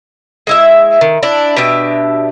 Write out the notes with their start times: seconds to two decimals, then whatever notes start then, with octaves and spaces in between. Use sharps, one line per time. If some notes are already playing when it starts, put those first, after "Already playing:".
0.47 G#3 E4 E5
1.01 D#3
1.23 D4 E4
1.57 B2 D4 G4 E5